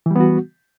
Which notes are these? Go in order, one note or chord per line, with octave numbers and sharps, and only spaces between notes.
E3 G3 B3 F#4